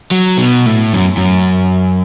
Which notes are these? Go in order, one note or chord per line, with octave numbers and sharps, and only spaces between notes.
F#3
B2
A2
F#2
F#2